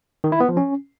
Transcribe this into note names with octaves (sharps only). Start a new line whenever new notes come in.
D#3
E4
B3
F3
C#4